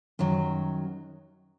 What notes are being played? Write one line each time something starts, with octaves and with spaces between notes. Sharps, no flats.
F#2 D#3 F#3